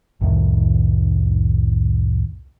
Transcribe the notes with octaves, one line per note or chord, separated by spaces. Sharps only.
C2 F2 A2 D#3